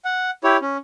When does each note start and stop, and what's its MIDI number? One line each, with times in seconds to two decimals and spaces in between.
0.05 0.31 78
0.44 0.57 64
0.44 0.57 67
0.44 0.57 73
0.61 0.77 61